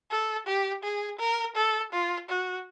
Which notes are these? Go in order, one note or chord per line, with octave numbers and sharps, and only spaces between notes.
A4
G4
G#4
A#4
A4
F4
F#4